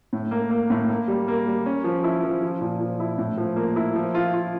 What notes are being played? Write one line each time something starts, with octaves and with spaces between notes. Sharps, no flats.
A2
A#3
A#3
A2
A#3
G3
A#3
G3
C#4
F3
E4
F3
F3
A#2
F3
E4
A2
F3
A#3
E4
F3
F4
F4